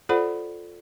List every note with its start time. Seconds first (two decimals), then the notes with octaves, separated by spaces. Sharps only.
0.09 F4 A4 C5 D5 F#5 B5